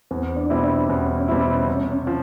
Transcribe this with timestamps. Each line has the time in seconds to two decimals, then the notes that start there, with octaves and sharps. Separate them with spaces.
0.11 E2 C4
0.36 D4
0.50 B2 G3 C4 E4
0.63 D4
0.89 E2 C#4
1.28 B2 G3 C4 E4
1.68 C3
2.07 F3